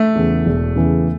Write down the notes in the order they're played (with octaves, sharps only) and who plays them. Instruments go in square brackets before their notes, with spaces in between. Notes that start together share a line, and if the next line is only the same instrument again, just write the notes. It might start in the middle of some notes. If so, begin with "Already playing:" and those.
Already playing: [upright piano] A3
[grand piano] E2 C#3 E3
E1
E2 C#3 E3